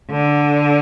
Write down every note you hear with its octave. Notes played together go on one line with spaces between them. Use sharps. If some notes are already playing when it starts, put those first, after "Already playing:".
D3